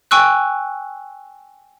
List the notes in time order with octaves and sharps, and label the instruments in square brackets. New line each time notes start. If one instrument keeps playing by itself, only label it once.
[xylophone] G5 G#5 C#6 E6 F#6